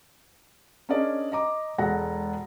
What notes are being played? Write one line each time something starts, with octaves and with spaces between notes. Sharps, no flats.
C#4 D4 G#4 A#4 D5 D#5
D#5 A#5 D6
E1 G#3 A4 F#5 A#6